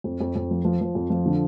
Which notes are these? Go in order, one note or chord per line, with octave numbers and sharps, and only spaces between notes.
F2
F2
F2
F3
F3
F3
F2
F3
D3